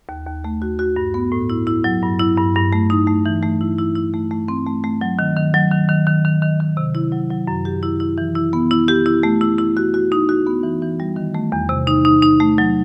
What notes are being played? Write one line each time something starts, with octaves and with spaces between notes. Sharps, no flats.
D#2
D#2
A3
F#4
F#4
G2
B3
A2
E4
E4
F#3
G2
E4
G2
G2
A3
D#4
A3
E3
A3
E4
E4
E4
A3
A3
C4
A3
A3
F#3
D#3
D#3
F#3
D#3
D#3
D#3
D#3
D#3
D#3
C3
E4
F#3
F#3
F#2
G4
E4
E4
E3
E4
B3
E4
G4
E4
A3
E4
E4
F#4
F#4
D#4
F#4
B3
E3
E3
G3
D#3
A3
E2
C3
D#4
D#4
D#4
A3
F#3